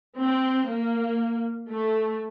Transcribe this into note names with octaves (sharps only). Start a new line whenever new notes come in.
C4
A#3
A3